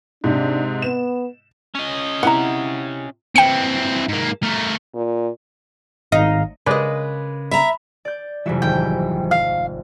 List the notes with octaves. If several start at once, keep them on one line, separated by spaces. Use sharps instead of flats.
G#2 C3 D4
B3 E7
C#4 D#5
C3 E4 F#5 A#5
E3 C4 G5 C#7
G#2 A#3
A3 A#4
A#2
G#1 D#4 F5
C#3 G#3 A#4 B4 D5 D#5
E5 A#5 B5
D5 G6
F1 E3 F#3 G3 E5
G#1 G5
F5